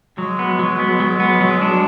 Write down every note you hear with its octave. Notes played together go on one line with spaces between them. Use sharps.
F#3 G#3
B3
F#3
B3
F#3
B3
F#3
D4